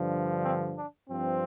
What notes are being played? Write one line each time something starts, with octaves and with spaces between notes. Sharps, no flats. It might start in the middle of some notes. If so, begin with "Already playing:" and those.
Already playing: G2 D3 F3
C4
D4
G2 F3 C4